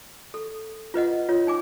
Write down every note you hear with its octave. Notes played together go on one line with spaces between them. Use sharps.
A4
F4 B4 D#5 F#5
F4 C#5
D#4 G#5 D6